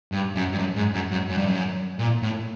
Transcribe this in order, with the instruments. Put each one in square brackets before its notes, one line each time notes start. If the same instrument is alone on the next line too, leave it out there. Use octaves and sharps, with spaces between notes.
[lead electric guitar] G2
F#2
G2
F#2
G#2
F#2
F#2
F#2
G2
F#2
A#2
A2